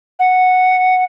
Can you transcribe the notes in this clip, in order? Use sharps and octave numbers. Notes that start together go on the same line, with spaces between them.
F#5